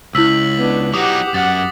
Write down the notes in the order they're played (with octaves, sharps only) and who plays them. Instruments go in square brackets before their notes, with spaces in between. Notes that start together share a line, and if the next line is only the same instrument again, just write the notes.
[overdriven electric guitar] C#2 [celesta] E4 E6 [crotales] B6 F#7
[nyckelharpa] B3 D4
[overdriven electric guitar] F#3 D#4 [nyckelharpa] G4 F#5 [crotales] D6 D#6
[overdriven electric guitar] F#2 [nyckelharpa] F#5 [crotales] A6